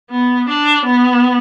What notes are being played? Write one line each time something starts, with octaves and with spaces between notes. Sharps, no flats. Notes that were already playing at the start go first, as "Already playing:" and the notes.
B3
D4
B3